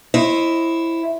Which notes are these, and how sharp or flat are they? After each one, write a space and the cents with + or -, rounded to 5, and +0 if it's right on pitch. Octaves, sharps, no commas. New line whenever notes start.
E4 +5 C5 +35 D#5 +0